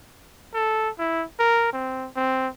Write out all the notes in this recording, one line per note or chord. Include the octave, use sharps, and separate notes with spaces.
A4
E4
A#4
C4
C4